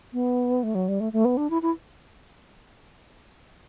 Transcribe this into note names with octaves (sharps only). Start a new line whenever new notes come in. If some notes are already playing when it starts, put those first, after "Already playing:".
B3
A3
F#3
G3
A3
A3
B3
D4
E4
E4